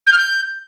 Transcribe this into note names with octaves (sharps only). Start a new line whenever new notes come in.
G6
F6
G6